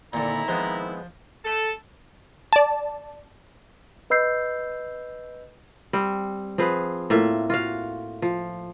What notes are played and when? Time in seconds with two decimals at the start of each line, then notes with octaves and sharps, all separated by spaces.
0.13 A#2 D3 D#3 C4 E4 A#5
0.48 F3 G#3 B3
1.44 A4
2.53 D5 A5
4.10 B4 D#5 B5 E6 G6 C7
5.93 G3 C4
6.58 F3 C4 G#4 B4
7.10 A2 A#3 F4 E5
7.50 F4 F#4 F5
8.22 F3